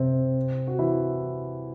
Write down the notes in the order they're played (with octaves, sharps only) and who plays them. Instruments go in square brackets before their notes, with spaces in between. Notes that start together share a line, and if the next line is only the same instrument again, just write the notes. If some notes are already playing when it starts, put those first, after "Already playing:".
Already playing: [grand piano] C3 C4
F#4
E3 E4